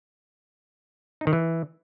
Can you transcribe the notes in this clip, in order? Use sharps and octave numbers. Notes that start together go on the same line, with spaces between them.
D#4
D#3
E3